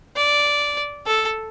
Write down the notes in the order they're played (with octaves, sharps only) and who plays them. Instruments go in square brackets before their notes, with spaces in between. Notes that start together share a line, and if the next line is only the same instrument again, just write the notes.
[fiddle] D5
A4